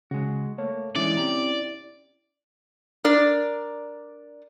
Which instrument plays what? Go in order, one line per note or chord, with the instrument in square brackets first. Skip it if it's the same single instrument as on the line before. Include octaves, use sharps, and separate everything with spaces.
[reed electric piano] C#3 [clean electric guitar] G#3 F#4
[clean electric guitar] A3 A#3 [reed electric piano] C#5
[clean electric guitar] D3 E3 G#3 [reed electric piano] C#4 E4 [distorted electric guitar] D5
[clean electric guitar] C4 G4 A#5
[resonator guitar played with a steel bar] D4 A#4 D5